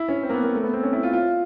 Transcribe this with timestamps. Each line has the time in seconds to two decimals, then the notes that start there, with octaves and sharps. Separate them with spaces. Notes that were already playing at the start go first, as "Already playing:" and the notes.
Already playing: E4
0.08 C#4
0.23 C4
0.29 A#3
0.33 B3
0.43 A#3
0.53 A3
0.63 B3
0.73 C4
0.83 C#4
0.93 E4
1.03 F4
1.13 F4